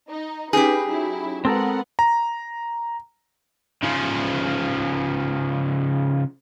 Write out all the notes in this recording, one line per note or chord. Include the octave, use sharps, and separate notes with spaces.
D#4
C#4 D#4 G4 G#4 B4
F#3 E4
G#3 B3 C4 A4 A#4 F#5
A#5
C#3 F3